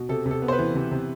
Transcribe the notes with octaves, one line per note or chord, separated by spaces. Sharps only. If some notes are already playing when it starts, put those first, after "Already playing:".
Already playing: B2
C3 A4
C3
A4
B3
C5
B4
E3
C3
C3